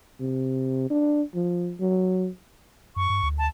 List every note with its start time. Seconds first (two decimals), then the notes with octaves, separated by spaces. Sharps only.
0.21 C3
0.90 D4
1.35 F3
1.80 F#3
2.96 F#2 C#6
3.10 G2
3.23 D2
3.38 A5